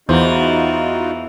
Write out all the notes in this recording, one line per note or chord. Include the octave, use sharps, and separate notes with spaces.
E2 E3 D#4 F4 F#4 C5